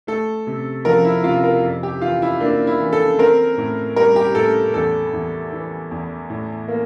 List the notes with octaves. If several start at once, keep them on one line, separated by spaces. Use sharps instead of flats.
A3 A4
C3
F3 A#4
E4
C3 F4
A#4
F2
G4
E3 F4
E4
A#3 D4
E4
E3
A4
C4 A#4
A2
G3 A#4
G4
A2 A4
E2 A4
E2
E3
E2
A2
A#3